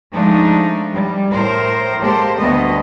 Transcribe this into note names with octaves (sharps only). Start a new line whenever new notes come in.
F3 G#3 A3 D4 D#4
G3
A2 A#4 C5
G#3 A#3 G4 A4 C5
D2 D3 G3 A3 B3 D#5